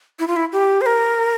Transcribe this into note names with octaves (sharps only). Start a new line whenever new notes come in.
E4
F4
E4
G4
C5
A#4